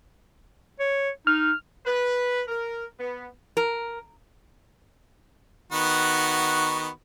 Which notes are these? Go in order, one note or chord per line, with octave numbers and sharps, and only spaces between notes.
C#5
D#4 F6
B4
A#4
B3
A#4
D#3 B3 F#4